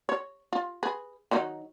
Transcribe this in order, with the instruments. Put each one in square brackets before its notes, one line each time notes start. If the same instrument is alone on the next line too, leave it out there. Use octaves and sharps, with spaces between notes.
[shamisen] C#5
F4
G#4 B4
D#3 F#3 D#4